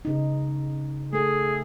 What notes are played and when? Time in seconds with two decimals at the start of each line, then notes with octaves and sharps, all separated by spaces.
0.05 C#3 D#4
1.13 A3 G#4 A4